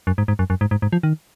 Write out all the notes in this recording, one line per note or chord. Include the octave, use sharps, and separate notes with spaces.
F#2
G#2
G#2
F#2
F#2
G#2
G#2
G#2
F3
D#3